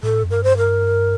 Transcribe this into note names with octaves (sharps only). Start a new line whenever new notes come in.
A2 A4
F2
G2 A#4
C5
A#4